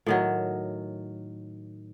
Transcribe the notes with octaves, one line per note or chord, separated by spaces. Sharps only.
A2 D#3 F#3